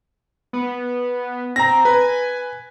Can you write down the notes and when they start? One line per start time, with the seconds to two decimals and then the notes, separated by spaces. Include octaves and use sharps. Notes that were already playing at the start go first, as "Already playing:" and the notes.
0.53 B3
1.56 C4 A#5 A#6
1.85 B4 G#5